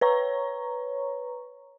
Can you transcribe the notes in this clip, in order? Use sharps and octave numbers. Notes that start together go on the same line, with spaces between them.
B4 C#5 A#5 C#6